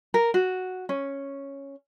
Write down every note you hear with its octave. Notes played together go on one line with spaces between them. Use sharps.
A#4
F#4
C#4